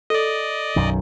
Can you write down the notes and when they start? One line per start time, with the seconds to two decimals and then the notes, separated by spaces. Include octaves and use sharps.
0.10 A4 D5 D#5
0.76 B1 F#2 D#3